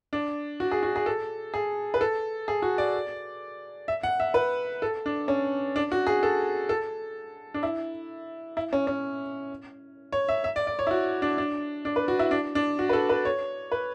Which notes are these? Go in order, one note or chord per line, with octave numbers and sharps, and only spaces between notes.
D4
F#4
G#4
F#4
G#4
A4
G#4
B4
A4
G#4
F#4
D5
E5
F#5
E5
B4
A4
D4
C#4
D4
F#4
G#4
A4
A4
D4
E4
E4
C#4
C#4
C#5
E5
E5
D5
D5
C#5
E4
F#4
D4
D4
D4
B4
F#4
E4
D4
D4
F#4
B4
A4
B4
C#5
B4